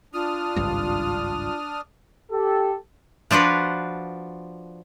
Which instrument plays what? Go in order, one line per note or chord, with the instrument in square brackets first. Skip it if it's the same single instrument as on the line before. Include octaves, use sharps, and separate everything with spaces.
[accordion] D4 D#6 F6 [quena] F4
[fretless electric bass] G#1 C#2 G2
[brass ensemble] G4 A4
[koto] F3 D4 F4 F#4 B4